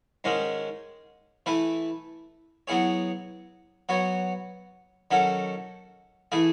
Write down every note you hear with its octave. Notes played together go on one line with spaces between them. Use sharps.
G#2 D#3 G#3 C#4
E3 A3 E4 B4
F#3 B3 E4 G#4 C#5
F#3 B3 F#4 C#5
D#3 F#3 C#4 F#4 A4
E3 A3 E4 G#4